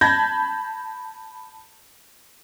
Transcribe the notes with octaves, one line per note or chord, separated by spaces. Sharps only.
A5 B5 G6 G#6 A#6